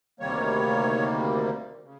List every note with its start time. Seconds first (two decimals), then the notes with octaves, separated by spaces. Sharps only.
0.20 D2 C3 D#3 G3 A#3 C#5
1.84 C#3